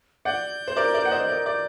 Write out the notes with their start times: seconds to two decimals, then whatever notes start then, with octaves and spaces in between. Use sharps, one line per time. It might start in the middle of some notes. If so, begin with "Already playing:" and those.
0.25 D5 F#5 G6
0.68 C5
0.77 A#4 D5
0.94 A#4 D5
1.05 F#5
1.11 C5 D#5
1.29 A#4 D5
1.46 D5